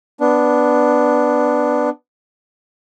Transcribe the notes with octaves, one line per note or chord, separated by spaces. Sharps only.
B3 D4